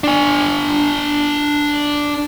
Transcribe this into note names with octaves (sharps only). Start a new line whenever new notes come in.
D4 G#5